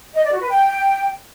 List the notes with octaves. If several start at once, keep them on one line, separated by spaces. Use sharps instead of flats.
D#5
D5
F#4
B4
G5